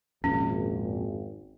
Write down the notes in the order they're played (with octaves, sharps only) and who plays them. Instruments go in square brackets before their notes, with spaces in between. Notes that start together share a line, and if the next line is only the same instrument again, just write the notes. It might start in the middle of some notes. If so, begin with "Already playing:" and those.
[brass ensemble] G#1 [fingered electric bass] F2 A#2 [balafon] C#4